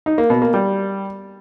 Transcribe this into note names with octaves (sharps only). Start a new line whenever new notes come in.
D#4
A#3
B2
A#3
G3